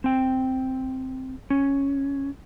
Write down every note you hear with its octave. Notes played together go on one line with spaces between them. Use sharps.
C4 G5
C#4